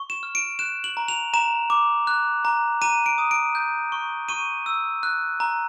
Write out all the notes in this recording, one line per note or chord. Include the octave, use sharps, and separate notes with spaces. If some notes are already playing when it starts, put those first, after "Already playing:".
Already playing: C#6
E7
F6
D7
F#6 E7
F#7
A#5
F7
A#5 E7
D6
F#6
A#5
A#5 D#7
D7
D#6
D7
G6
C#6
C#6 D#7
E6
F#6
A#5